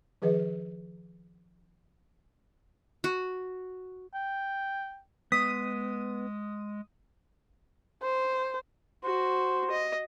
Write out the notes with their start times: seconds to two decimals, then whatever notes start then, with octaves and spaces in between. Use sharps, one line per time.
0.22 D#3 F3 G#4 B4 D#5
3.04 F#4
4.14 G5
5.32 G#3 B3 D#6 B6
8.03 C5
9.04 F#4 C5
9.71 D#5